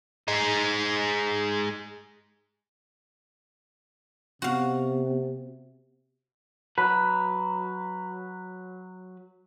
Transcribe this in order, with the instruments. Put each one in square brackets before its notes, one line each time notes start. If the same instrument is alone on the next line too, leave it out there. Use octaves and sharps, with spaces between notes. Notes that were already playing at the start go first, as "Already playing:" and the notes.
[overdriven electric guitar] G#3 D#4
[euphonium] C3 [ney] B3 [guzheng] F#4 F5
[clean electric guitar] F#3 B4